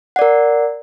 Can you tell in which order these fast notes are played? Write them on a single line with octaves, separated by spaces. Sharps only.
F#5 D5 A#4